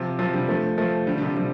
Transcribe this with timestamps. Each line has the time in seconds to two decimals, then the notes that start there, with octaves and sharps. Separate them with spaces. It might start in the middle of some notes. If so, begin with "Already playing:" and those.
Already playing: C3 F3
0.19 C3 F3
0.34 D3 G3
0.48 F3 A3
0.78 F3 A3
1.07 D3 G3
1.18 D3
1.22 C3 F3
1.37 D3 G3